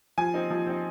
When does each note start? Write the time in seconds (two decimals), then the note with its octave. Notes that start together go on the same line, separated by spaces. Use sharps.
0.18 F3 G#5
0.34 C4 D#4
0.51 F3
0.67 C4 D#4